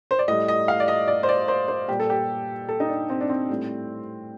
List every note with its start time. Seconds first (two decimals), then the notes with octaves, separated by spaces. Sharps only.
0.11 C5
0.19 D5
0.28 A2 G3 D#5
0.48 D#5
0.68 F5
0.80 D5
0.88 D#5
1.08 D5
1.23 C5
1.29 D5
1.48 C5
1.68 C5
1.88 A#2 G3 G4
2.00 A4
2.10 G4
2.69 A4
2.80 D#4
2.89 D4
3.10 C4
3.21 D4
3.29 C4
3.50 A2 G3